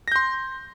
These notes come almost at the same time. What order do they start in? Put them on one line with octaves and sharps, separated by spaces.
A#6 G6 C6